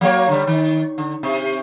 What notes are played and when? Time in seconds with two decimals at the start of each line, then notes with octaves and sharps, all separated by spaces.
0.01 F#3 A#3 C#5
0.29 D3 G3
0.47 D#3
0.98 D3
1.23 C3